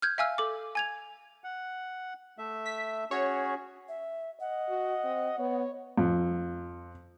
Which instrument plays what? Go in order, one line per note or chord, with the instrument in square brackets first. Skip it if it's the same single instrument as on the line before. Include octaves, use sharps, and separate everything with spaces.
[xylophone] F6 G6 G#6
E5 F5 G#5 E6 F6
A4 D6
G#5 G#6 F7
[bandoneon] F#5
A3 E5
[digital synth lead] B6
[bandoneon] C#4 F#4 G#4 [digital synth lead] C#5
[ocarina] E5
[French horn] D#5 [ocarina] F#5
[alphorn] F#4
C4
[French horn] B3 [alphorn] C#5
[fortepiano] F2